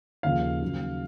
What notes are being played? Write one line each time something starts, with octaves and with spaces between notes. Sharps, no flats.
D#2 C#3 F3 F5
D#2 C#3 F#3